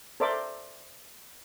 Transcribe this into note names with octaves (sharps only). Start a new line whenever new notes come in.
A4 A#4 C5 D5 E5 D6